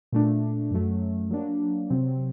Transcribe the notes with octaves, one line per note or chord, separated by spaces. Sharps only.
A#2 A3 D4
F#2 F#3 A3
F#3 A#3 D4
C3 F#3 C4